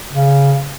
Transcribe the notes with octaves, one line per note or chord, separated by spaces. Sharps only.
C#3